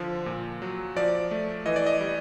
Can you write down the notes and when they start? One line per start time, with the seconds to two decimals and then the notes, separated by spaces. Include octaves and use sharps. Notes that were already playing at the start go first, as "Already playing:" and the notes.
Already playing: D3 F3
0.26 A#2
0.62 F#3
0.96 F3 D5
1.31 A3
1.66 E3 D#5
1.76 D5
1.86 D#5
2.01 G3